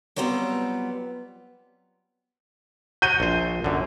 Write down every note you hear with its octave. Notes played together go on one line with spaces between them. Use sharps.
F#3 G3 B3 C4 F4
F#4 G6 D#7 G7
A#1 C5
F#2 D3